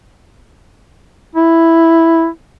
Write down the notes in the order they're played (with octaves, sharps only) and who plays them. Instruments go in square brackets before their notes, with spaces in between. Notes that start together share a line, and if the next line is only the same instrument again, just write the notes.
[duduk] E4